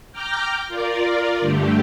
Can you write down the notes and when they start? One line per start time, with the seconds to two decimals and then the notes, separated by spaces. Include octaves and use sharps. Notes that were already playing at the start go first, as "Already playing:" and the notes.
0.12 G5 A#5 D6 F6 G6
0.68 F4 A#4 D5
1.40 G2 D3 A3 G4